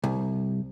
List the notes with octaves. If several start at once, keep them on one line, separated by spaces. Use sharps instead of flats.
C2